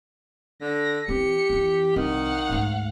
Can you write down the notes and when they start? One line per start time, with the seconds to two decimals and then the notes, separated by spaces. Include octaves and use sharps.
0.61 D3 A#6 B6
1.08 E3 C4 G4 C#7
1.50 F2 E3
1.96 C2 D#3 F5 F#5
2.49 D2 G#2